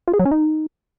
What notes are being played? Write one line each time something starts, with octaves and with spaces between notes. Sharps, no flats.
F4
G#4
F#3
C#4
D#4